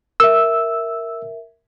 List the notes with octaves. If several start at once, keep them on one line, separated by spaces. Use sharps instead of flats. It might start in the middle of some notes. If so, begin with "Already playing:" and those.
A#4 E5 E6